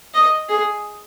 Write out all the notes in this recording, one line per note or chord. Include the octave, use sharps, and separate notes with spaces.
D#5
G#4